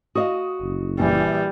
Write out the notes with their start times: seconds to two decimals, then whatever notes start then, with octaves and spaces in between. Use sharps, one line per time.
0.15 F#4 D#5 F5 D#6
0.61 F#1
1.00 A#1 E3 G3